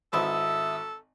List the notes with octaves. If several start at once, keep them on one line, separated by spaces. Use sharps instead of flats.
G#1 B3 C4 E4 A4 E5 D#6 E6